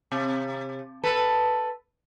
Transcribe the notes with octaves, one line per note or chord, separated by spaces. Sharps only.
C3
A4 B4